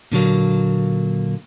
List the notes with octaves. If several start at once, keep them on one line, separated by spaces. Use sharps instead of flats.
A#2 D3 F#3 A#3